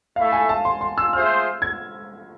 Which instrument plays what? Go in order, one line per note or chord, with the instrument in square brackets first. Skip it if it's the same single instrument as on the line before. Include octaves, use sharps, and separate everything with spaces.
[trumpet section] A3 E4 A4 E5 [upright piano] F5
[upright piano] G#5
A5
C6
C6
E6
[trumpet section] F4 G#4 C5 E5 [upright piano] F6
[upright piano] G#6